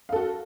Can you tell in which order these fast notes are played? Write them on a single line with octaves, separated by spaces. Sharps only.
F5 A4 F#4